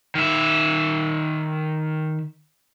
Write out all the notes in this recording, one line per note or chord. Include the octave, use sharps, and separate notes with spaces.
D#3 E5